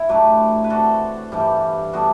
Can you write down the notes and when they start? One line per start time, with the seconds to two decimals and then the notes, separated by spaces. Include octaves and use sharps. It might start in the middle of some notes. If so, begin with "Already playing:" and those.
Already playing: E4
0.09 A2 F#3 A3 D4 G4 B4
0.64 B4
0.70 D3 A3 C4 F#4 A4
1.32 G2 E3 G3 D4
1.93 A2 G3 B3 D4 F#4